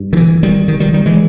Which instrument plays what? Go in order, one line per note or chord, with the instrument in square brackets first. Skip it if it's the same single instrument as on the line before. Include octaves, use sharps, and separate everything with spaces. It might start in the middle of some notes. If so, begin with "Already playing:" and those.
Already playing: [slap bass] G2
D#3
E3
D#3 G3
D#3
D#3 G3
D#3 G3
E3 G#3